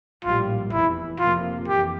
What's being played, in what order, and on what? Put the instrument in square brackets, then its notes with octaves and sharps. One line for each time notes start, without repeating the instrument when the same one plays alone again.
[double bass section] A#1 A2 G3 [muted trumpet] F4
[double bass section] F1 E2 E3 [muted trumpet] E4
[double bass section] F1 F2 C3 F3 A#3 [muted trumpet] F4
[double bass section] F2 E3 [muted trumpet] G4